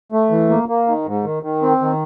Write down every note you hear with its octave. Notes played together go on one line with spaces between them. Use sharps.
A3
E3
A#3
A#3
D#3
G#2
D#3
D#3
C4
D#3